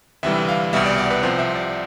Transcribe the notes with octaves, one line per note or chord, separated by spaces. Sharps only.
D2 C3 E3 G3 E5
F5
C2 B2 G3 E5
D5
D5
B4
C2 C3 F3 C5
E5
D5